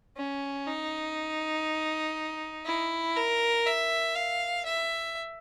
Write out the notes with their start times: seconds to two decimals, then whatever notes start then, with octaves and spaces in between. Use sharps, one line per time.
0.17 C#4
0.67 D#4
2.66 E4
3.16 A#4
3.66 E5
4.16 F5
4.65 E5